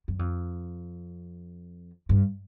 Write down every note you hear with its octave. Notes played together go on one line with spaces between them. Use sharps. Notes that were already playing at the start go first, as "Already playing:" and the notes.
F#2
F2
G2